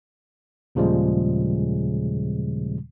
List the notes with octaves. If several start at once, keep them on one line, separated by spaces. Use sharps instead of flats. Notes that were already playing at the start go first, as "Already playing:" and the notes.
D#2 A#2 C#3 F3 G3 G#3